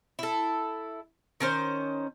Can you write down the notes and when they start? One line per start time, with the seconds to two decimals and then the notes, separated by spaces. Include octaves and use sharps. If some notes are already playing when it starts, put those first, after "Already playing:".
0.19 E4 A4
1.40 D#3 C#4 C5